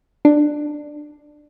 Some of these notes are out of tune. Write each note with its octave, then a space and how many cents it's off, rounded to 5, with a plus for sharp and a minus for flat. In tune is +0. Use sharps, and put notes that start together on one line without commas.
D4 +15